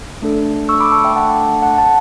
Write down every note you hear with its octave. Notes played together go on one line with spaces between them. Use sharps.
A3 D4 A4
C#6 E6
B5 D6
A5 C#6
E5 G5
F#5 A5
F#5 A5
F#5 A5